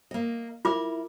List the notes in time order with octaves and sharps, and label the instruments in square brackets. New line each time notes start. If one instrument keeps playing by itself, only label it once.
[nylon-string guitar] A#3 D#5
[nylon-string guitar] E4 A#4 [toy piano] F4 D6